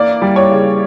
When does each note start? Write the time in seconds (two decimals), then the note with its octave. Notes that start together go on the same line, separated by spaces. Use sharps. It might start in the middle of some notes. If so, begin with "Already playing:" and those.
Already playing: E3 A#3 D5
0.22 G3
0.36 C#5
0.51 C#3